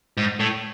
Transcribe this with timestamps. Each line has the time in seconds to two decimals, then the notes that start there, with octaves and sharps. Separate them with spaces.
0.17 G#2
0.40 A2